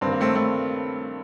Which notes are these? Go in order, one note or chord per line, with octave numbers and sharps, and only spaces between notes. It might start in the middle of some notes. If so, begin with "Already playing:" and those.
G2 D#3 C4
A#3
A3 C4
A3 C4